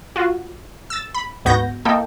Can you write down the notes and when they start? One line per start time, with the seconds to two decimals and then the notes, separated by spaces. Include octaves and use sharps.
0.16 F4 F#4
0.90 E6 A6
1.14 B5
1.45 D2 G#2 B3 F#4 G6 A#6
1.85 A#3 E4 A4 D#5 G5